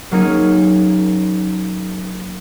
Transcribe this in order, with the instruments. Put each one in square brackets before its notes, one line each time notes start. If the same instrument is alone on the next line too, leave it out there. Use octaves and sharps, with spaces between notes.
[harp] F#3 A#3 C#4 D#4 G#4